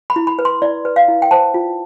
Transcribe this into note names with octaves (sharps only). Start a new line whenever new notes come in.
B5
E4
B5
B4
C6
E4 D5
B4
F5
E4
G5
C5 A5
F4